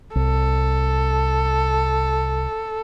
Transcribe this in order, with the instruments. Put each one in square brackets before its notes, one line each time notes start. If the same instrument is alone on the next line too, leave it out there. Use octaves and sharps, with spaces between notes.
[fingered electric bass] C2 [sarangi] A4